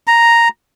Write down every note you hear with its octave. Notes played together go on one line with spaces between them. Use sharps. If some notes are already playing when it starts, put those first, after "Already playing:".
A#5